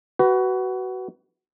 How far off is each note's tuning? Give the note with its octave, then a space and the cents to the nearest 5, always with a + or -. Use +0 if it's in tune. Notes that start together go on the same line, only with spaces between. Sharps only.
F#4 +20 B4 +0